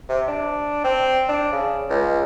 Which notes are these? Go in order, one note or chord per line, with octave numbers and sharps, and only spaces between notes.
C3
D4
C4
D4
C#3
C#2